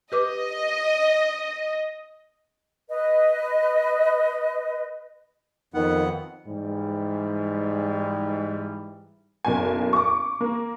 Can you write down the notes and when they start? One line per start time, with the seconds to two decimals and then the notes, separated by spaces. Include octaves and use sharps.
0.12 G4 B4 D#5 D6
2.90 B4 D#5
5.74 F2 D#3 B3 F#5
6.47 G#2 E3 G3
9.45 F#1 B1 G#5
9.93 C#6 D6
10.41 A#3